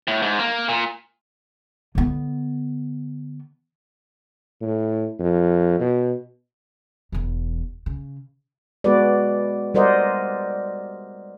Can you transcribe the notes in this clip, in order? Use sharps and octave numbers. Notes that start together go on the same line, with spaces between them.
A2
G#2
A#3
A#2
D3 B3
A2
F2
B2
E1 E2
C#3
G#3 B3 F#4 G#4 B4 D5
G3 A#4 C5 D5 D#5 F#5